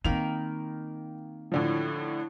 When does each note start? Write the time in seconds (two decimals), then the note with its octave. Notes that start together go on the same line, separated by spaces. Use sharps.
0.05 D#3 A#3 C4 D#4 B5 F7
1.52 A2 D3 F3